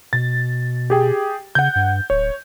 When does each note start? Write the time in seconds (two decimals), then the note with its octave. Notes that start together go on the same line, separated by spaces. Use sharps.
0.13 B2 A6
0.90 G4 G#4 G5
1.55 C#3 F#5 G6
1.75 G2
2.10 D1 C#5